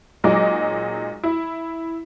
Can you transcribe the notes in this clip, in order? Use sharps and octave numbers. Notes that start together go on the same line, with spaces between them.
A#2 F#3 G#3 D#4 D6
E4